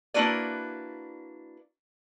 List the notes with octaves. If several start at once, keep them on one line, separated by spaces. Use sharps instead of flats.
A#3 D4 E4 F#4 B4 D5